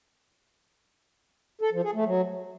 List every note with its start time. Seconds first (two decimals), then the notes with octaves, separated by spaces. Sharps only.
1.61 A4
1.72 F3
1.83 G#4
1.95 A3
2.06 F#3